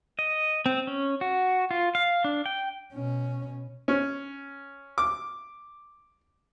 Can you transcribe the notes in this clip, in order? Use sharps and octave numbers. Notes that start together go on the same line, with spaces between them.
D#5
C4
C#4
F#4
F4
F5
D4
G5
B2 C#4
C#4
D6